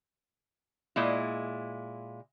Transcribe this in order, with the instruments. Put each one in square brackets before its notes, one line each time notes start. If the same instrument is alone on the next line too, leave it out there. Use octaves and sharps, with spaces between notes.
[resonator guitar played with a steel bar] A#2 G#3 E4